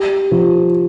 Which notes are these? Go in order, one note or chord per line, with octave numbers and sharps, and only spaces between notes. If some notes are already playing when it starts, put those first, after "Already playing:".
Already playing: G4
F3